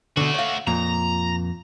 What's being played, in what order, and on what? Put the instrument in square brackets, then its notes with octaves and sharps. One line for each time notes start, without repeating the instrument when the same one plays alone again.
[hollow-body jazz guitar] B2 D3 [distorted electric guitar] A3 F#4
[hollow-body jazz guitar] C#5 F5
[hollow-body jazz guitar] F2 A#2 [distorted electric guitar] A#5